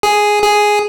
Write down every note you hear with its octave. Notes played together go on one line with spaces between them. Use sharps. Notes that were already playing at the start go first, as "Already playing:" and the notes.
G#4
G#4